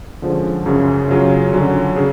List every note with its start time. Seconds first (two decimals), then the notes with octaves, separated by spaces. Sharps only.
0.22 D3 F3 G#3 C#4
0.66 F#2 C#3 F#3 C#4
1.08 C#3 F#3 C#4 F4
1.53 D3 F#3 C#4
1.96 C#3